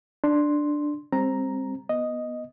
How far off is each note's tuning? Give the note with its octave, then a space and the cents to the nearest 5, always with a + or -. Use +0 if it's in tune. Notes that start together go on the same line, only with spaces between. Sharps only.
D4 +5 C6 +0
G3 +40 C4 +15 A#5 +0
B3 -15 D#5 +0